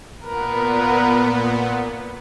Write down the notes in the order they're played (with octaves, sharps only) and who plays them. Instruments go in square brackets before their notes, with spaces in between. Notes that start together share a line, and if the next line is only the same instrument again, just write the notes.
[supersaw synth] A#2 B3 [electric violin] A#4 B4